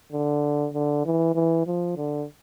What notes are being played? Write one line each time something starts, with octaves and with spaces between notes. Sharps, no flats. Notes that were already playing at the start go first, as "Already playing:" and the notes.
D3
D3
E3
E3
F3
D3